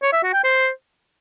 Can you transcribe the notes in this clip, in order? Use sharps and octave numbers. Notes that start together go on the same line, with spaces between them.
C#5
E5
F#4
G5
C5